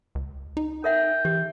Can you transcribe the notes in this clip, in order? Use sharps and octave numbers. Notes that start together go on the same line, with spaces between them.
C#2
D#4
A#4 E5 F#5 G5
E3 G4